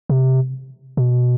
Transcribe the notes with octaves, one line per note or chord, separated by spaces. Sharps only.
C3
B2